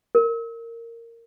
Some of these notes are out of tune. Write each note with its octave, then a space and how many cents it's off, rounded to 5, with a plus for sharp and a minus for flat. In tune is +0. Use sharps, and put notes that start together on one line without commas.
A#4 -15